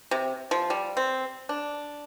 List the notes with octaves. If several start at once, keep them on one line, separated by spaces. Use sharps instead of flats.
C3
F3
G3
C4
D4